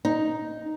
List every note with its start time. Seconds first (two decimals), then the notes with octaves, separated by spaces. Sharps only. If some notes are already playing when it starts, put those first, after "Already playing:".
0.05 D#4